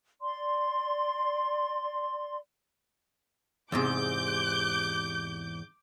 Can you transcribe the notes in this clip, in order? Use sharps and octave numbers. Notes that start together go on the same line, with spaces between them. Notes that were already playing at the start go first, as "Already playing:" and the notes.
D5 C6
E2 G#2 C3 D6 G6